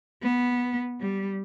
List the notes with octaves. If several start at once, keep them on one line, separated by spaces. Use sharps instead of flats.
B3
G3